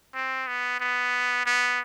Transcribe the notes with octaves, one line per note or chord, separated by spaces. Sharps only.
C4
B3
B3
B3